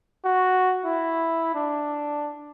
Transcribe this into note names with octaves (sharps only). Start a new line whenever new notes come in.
F#4
E4
D4